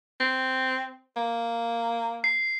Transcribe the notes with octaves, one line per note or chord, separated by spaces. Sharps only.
C4
A#3
C7